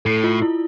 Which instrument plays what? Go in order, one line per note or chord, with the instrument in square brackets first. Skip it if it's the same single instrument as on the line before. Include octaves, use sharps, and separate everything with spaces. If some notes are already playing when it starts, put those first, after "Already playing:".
[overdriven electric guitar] A2 [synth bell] A4
[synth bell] F4
E4